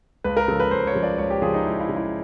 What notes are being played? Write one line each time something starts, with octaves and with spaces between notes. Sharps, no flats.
C#2 B4
A#4
C#3 F3 A4
B4
C#2 C5
C#5
C#3 F3
D5
C#2 C#5
G4
C#3 F3 G#4
D#4
C#2 E4
E4
C#3 F3
E4